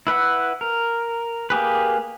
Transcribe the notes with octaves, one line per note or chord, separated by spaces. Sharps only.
E4 B4 E5 F#5
A#4
A#3 G4 G#4 B4